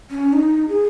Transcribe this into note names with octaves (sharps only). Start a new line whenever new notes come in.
C#4
D#4
G#4